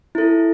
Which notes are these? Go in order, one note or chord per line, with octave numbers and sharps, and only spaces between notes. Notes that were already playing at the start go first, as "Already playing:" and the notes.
E4 A4